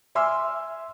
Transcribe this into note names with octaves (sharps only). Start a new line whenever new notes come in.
E5 G#5 C6 D6 E6 F6